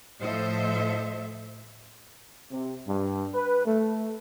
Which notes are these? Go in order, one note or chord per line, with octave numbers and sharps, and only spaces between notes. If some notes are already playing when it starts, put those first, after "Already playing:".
A2 F3 A4 C5 D#5 E5
C3
G2
B4
A3